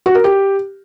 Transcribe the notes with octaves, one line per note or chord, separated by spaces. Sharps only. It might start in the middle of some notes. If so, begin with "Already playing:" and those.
F#4
A#4
G4